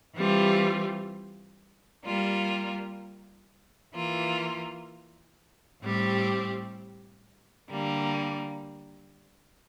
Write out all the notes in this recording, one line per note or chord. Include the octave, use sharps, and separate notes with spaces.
E3 G3 C4 F4
G3 A#3 F4
E3 A#3 F4
A2 G3 C4 G4
D3 G3 A#3